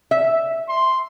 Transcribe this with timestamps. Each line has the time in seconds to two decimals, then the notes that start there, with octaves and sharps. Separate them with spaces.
0.11 E5
0.69 C6